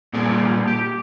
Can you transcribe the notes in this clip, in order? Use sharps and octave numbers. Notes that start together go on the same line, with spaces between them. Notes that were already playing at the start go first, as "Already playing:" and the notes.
A#2 G3 A#3 G#4 D5 A5
G4